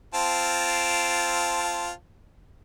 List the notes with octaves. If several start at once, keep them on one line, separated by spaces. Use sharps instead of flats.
C4 F4 A5